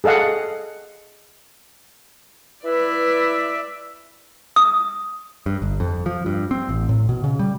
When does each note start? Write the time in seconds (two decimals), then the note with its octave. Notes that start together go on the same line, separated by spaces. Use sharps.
0.04 G#4 A4 D#5 F5 F#5
2.65 E4 B4 D5 E5
4.56 D#6
5.46 G2
5.62 G1
5.80 F2
6.06 F3
6.26 G2
6.51 C4
6.69 A1
6.89 A2
7.09 B2
7.24 C#3
7.39 G3